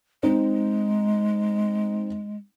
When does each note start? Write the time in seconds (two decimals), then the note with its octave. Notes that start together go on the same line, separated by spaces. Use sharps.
0.23 G#3 C4 D#4